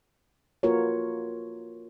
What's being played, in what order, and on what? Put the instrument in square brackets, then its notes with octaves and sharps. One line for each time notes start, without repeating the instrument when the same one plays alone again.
[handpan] A#3 F4 F#4 A#4 B4 C#5